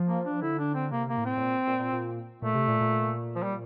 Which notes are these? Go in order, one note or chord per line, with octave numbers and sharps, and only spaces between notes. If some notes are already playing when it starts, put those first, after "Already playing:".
Already playing: F3
A#3
D4
D3 E4
D4
C4
C3 A#3
A#3
A2
C4
A2
A#2
A#2
A#2
A#2
A#2 A3
C3
A#2
A#2
F3
G3